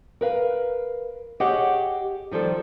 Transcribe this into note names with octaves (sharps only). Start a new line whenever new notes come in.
A#4 B4 F5
G4 G#4 C#5 D#5 F#5
D#3 F3 G3 A4